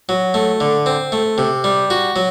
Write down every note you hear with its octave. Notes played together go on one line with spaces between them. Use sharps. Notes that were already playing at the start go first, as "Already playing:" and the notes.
F#3
A3
D3
C4
A3
C3
G3
F#4
F#3